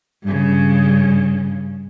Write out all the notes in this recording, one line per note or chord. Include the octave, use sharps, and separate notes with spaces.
G2 C#3